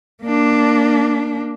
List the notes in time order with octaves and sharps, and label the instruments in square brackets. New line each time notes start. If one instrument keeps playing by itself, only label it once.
[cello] A#3 D4